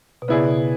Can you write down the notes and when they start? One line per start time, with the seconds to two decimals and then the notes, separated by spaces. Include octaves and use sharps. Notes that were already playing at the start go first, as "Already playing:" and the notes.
0.22 B2
0.28 C#3 B3 E4 G#4 D5
0.50 B2